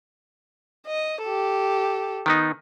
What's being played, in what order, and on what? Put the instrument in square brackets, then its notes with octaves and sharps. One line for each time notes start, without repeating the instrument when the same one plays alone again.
[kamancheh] D#5
G4 A4
[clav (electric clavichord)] D#3 B3 D#4